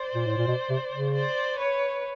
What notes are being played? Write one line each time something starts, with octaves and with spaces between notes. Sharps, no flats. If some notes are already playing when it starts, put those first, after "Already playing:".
Already playing: C5 D5
A#2
A2
A#2
B2
C3
C#3
C5 D5
B4 C#5